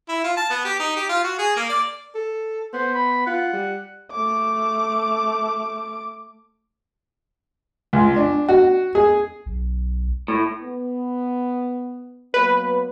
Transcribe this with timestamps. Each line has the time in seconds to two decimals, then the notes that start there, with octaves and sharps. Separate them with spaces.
0.08 E4
0.24 F4
0.37 A5
0.50 B3
0.65 G4
0.79 D#4
0.96 G4
1.09 F4
1.24 F#4
1.38 G#4
1.57 A#3
1.69 D5
2.15 A4
2.73 B3 C5
2.95 B5
3.27 F4 F#5
3.53 G3
4.12 A3 D6
7.93 C#2
8.16 D4
8.49 F#4
8.95 G#4
9.46 B1
10.28 A2
10.63 B3
12.34 F#3 A#3 B3 B4